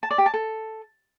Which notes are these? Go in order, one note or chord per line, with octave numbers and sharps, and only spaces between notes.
A5
D5
G4
A5
A4